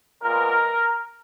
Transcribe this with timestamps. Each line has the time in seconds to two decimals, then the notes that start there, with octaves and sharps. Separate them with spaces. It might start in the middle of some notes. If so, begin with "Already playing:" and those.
0.22 A#2 G#3 B3 A#4